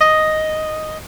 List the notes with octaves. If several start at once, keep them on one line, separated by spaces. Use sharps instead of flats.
D#5